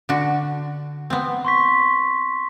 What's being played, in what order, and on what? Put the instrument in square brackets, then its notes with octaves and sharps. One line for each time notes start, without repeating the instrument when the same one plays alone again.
[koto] D3 F#4
B3 C4
[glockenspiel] C6 C#6 B6